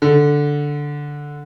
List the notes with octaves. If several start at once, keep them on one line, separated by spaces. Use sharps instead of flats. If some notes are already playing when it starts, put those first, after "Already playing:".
D3